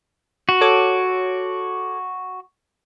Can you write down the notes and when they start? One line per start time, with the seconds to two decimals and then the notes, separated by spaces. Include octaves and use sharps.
0.49 F#4
0.61 A4 C#5 D6